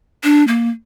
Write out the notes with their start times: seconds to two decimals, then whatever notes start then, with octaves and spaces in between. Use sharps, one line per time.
0.24 D4
0.48 A#3